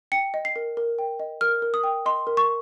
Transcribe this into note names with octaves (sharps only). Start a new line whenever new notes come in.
G5 C#7
D#5
C7
A#4
A#4
G5
D#5
A#4 F6
A#4
D#6
G5
D#5 C6
A#4
C#6